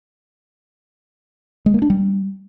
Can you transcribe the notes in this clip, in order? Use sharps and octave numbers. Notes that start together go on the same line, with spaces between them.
G#3
A#3
D4
G3